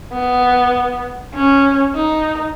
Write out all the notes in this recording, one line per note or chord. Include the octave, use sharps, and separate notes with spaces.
B3
C#4
D#4